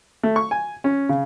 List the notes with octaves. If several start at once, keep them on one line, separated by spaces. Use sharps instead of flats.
A3
C#6
G#5
C#4
C#3